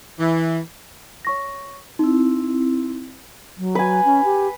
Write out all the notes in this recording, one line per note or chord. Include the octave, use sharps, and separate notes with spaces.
E3
C#5 C#6 A#6
C4 D#4 E4
F#3
B4 G#5
C#4
G4